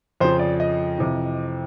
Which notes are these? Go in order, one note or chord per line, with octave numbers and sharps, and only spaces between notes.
F2 C#3 F3 C5
D5
D#5
F2 C3 E3